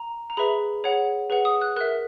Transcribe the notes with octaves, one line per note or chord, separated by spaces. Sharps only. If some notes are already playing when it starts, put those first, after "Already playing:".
Already playing: A#5
A#5
G#4 B4 E5 B5
G#4 C#5 F#5
G#4 B4 F#5
D#6
F#6
A#4 E5 F#6